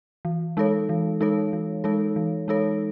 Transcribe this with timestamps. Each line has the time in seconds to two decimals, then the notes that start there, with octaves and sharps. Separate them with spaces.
0.25 E3
0.57 G#3 D#4 A4 C#5
0.89 E3
1.21 G#3 D#4 A4 C#5
1.53 E3
1.84 G#3 D#4 A4 C#5
2.16 E3
2.48 G#3 D#4 A4 C#5